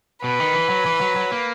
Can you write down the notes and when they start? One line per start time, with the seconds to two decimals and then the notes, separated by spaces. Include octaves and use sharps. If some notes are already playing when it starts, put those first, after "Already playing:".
0.24 B2 B4
0.40 D#3
0.54 E3
0.70 F#3
0.86 E3
1.01 F#3
1.16 F#3
1.31 A#3